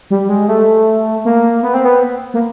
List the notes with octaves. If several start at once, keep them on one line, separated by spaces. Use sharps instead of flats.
G3
G#3
A3
A#3
B3
C4
B3
A#3